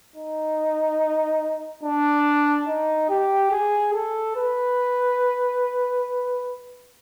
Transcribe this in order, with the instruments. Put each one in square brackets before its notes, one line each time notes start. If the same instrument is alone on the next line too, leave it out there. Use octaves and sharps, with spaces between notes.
[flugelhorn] D#4
D4
D#4
G4
G#4
A4
B4